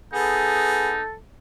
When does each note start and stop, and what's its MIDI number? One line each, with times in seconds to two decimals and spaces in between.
0.13 0.99 59
0.13 1.02 63
0.13 0.92 68
0.13 1.14 69